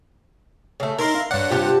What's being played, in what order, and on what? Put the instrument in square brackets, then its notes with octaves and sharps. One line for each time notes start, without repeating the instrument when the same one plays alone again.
[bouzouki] C#3 A3
[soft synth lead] D#4 [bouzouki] E4 [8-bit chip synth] A#4 A#5 C6
[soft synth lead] F5
[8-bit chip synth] G2 F#5 [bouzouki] D4 [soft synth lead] C#5
[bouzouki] C3 G4 A5 [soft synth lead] F4